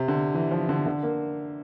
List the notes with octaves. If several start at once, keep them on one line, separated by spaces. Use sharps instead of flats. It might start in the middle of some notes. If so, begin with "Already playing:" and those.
Already playing: C3
D3
E3
F3
D3
D3
A#3